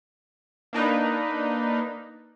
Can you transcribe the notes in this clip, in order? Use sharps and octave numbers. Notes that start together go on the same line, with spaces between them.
A#3 D4 D#4 B4